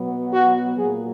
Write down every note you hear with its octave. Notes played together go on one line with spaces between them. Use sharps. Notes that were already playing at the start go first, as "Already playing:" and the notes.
Already playing: B2 F#3 B3
F#4
A#2 F#3 A#3 G#4